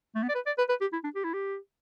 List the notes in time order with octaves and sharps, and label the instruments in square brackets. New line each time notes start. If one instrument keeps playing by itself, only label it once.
[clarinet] A3
B3
D5
B4
D5
B4
B4
G4
E4
D4
G4
E4
G4